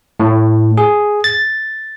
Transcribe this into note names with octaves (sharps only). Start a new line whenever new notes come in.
A2
G#4
A6